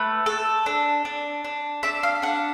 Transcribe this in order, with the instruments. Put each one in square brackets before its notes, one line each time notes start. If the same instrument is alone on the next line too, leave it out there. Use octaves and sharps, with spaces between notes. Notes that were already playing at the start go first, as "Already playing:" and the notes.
Already playing: [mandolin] A3 B4
A4
D4
D4
D4
D4 E5
F5
D4 F#5